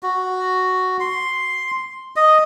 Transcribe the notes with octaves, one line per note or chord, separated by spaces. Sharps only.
F#4
C6
D#5